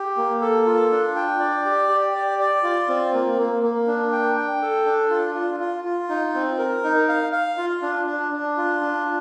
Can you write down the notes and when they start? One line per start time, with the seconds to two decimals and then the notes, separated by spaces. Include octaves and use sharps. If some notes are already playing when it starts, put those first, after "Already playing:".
Already playing: G4
0.17 A#3
0.41 A4
0.66 F4
0.92 D4
1.16 G5
1.40 D5
1.65 G4
1.89 G4
2.15 D5
2.39 D5
2.63 F4
2.88 C4
3.13 A#3
3.38 A#3
3.63 A#3
3.87 D4
4.12 G5
4.36 G5
4.62 A4
4.86 D4
5.10 F4
5.35 F4
5.60 F4
5.84 F4
6.09 D#4
6.35 C4
6.59 A#4
6.84 D#4
7.09 F5
7.32 F5
7.57 F4
7.82 D4
8.07 D4
8.32 D4
8.57 F4
8.81 D4